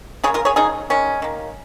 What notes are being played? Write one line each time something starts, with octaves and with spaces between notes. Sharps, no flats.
C#3 A#3 G#4 C#5
F4 A#4
G#4 C#5
C#3 G#3 D#4 G#4
D#3 G#3 C#4
D#3 A#3